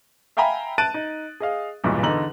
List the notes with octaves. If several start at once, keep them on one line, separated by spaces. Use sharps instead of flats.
E5 F5 G5 G#5 A#5 B5
A5 F#6 A6 D7 D#7
D#4
G#4 D#5 F5
B1 E2 G2 A#2
E2 D3 D#4 A#5 F#7